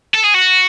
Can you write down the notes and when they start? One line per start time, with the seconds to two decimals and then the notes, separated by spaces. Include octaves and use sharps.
0.15 A4
0.24 G#4
0.35 F#4